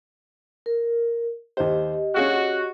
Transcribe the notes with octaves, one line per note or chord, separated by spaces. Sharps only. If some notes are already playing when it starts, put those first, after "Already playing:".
A#4
D#2 G4 C5 D#5
C#4 F#4 G#4 F5